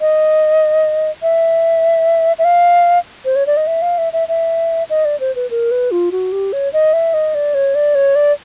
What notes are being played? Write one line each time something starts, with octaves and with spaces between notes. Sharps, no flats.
D#5
E5
E5
F5
C5
C#5
D5
D#5
E5
F5
E5
E5
E5
D#5
D5
C5
B4
A#4
B4
F4
F#4
G4
C#5
D#5
E5
D#5
D5
C#5
D5
C#5
D5